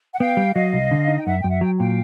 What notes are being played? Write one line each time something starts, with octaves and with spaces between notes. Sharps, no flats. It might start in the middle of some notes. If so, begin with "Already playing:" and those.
F#5
B3 F5 G5
G3
F#3 D#5 F5
C2
D3
D#4
G5
F#2 E5 F#5
F#2 G5
E5 F#5
F#3 G5
A#2 F5 G5